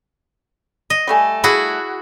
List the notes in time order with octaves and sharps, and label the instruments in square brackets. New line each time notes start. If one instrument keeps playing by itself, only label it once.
[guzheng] D#5
[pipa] G3 A3 G#5
[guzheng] E4 F#4 G#4